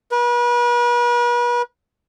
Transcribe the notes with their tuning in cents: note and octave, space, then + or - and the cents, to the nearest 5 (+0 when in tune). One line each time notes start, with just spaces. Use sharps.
B4 -40